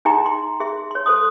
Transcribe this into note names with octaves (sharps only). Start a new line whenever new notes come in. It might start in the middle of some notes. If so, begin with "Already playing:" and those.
D#4 G#4 E5 G5 A#5 C6
C6
G#4 E5 C6
C#5 C6
A4 C5 C6 D#6